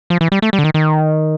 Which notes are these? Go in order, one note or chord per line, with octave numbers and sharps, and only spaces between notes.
F3
E3
G3
A3
G3
D3
D#3
D#3